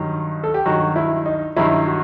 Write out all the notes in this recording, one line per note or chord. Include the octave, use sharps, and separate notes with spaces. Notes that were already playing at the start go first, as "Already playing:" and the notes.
Already playing: G2 D#3 F#3
A4
G4
G2 D#3 F#3 F#4
E4
D#4
G2 D#3 F#3 E4
F#4